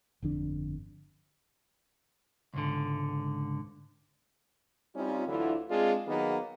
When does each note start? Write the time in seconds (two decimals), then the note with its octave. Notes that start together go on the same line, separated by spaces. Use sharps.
0.22 G1 F2 D3 D4
2.54 C#2 G#2 D3
4.95 G3 C4 C#4 D#4 F4
5.27 D2 D3 E3 F#3 E4 F4
5.70 G#3 C4 D4 F4 G#4
6.07 D#3 F#3 A#3 B3 D#4 G#4